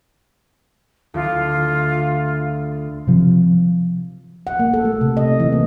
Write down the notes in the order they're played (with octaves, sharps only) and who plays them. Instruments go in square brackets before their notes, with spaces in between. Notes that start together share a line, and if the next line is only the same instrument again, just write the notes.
[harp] D2 [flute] F4
[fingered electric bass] C3 F3
[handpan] F#5
A#3
A4
A3
C3
D#5
E3
A#3